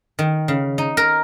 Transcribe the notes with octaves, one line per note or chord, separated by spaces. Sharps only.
D#3
C#3
D#4
A#4